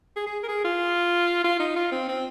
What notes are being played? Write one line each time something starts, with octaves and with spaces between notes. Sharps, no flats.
G#4
G#4
A#4
G#4
F4
F4
D#4
F4
C4
C4